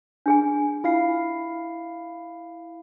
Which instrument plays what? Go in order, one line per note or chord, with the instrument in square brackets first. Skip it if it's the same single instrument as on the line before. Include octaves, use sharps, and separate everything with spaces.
[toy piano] D4 G#4 G#5
[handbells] E4 F5 C7 [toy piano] F4